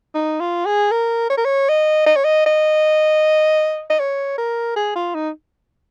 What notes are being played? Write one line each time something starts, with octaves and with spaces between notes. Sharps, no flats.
D#4
F4
G#4
A#4
C#5
A#4
C#5
D#5
D#5
C#5
D#5
D#5
D#5
C#5
A#4
G#4
F4
D#4